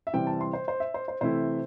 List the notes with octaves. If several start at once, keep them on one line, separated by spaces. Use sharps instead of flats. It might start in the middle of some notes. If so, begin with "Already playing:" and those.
E5
C3 E3 G3 C4 G5
A5
C6
C5
C5
E5
C5
C5
C3 E3 A3 C4 E4 C5